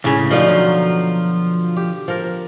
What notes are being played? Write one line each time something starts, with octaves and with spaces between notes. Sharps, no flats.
C#2 A2 C#3 G#4
B2 D3 F3 D#4 F4
F#3
G4
F3 A#4